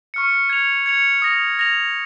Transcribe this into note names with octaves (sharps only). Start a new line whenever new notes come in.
C#6 F6 C#7
G#6 C#7 F7
G#6 C#7 F7
D#6 A#6 F7
D#6 A#6 F7